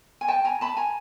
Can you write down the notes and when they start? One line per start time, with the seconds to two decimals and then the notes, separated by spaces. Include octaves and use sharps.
0.21 G#5
0.28 G5 A5
0.45 G#5 A#5
0.61 A5 B5
0.77 G#5 A#5